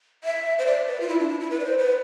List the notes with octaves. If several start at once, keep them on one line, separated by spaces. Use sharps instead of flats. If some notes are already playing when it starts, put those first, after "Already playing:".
E5
C5
D5
B4
F4
E4
D4
E4
E4
B4
D5
C5
B4